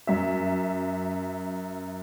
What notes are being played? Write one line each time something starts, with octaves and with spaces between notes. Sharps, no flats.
F#2 E5